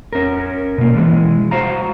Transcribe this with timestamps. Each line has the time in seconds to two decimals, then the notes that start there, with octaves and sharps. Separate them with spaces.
0.13 C#4 A#4
0.78 B2 A#3
0.96 E3 G#3
1.51 F#4 C5 F5 A#5